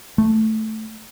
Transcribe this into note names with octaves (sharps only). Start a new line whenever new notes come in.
A3